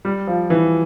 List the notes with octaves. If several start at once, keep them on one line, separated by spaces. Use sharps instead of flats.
G3
F3
E3